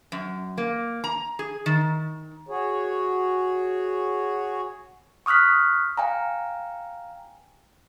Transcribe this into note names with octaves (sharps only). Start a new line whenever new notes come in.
F#2
A#3
A#5
G#4
D#3
F#4 G#4 C#5
C#6 D#6 F6 F#6 B6
F5 G5 G#5 A#5